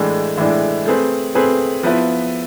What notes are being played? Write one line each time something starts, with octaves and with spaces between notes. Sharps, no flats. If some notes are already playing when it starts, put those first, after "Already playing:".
Already playing: A2 E3 G#3 D4
A2 E3 G#3 D4
A3 C4 G#4 B4
A3 C4 G#4 B4
F3 B3 E4 B4